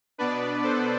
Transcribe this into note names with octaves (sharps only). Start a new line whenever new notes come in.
B2 B3 D4 B4 D5
A4 C5